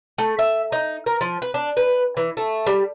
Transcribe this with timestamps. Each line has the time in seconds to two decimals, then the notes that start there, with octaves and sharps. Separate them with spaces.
0.18 A3
0.39 E5
0.72 D#4
1.06 A#4
1.21 F3
1.42 B4
1.54 D4
1.77 B4
2.17 E3
2.37 A3
2.66 G3